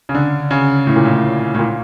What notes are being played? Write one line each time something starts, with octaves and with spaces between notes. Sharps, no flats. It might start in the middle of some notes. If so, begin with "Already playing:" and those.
C#3
D3
C#3
A2
A#2
A2
A2
A#2